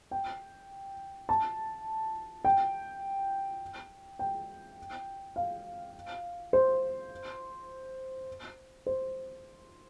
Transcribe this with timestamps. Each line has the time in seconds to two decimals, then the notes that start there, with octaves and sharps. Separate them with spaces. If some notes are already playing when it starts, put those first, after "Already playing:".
0.11 G5
1.29 A5
2.45 G5
4.19 G5
5.36 F5
6.53 C5
8.86 C5